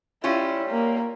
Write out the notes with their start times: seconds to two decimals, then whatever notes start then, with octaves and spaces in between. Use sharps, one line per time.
0.24 G3 C#4 E4 F4
0.70 A#3